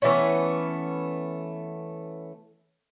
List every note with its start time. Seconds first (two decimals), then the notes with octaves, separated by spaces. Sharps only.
0.02 E3 A3 B3 C#4